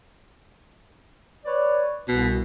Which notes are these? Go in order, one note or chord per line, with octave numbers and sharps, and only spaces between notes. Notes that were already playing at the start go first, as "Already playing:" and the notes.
B4 C#5 D5
C2 B2